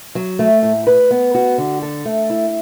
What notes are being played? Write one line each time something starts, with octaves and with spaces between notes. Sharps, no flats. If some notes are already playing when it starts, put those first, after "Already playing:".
F#3
A3
A2
B4
B3
F#4
D3
A4
A3
E4